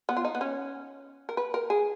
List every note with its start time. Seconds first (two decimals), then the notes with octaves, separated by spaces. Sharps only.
0.09 B3
0.17 F4
0.25 D#4
0.35 B3
0.41 C#4
1.29 A#4
1.37 B4
1.54 A#4
1.70 G#4